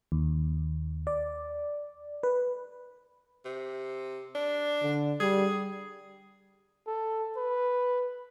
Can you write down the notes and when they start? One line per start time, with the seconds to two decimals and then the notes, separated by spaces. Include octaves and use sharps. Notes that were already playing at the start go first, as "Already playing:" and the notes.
0.12 D#2
1.07 D5
2.23 B4
3.45 C3
4.35 D4
4.82 D3
5.20 G3 G#4
6.87 A4
7.37 B4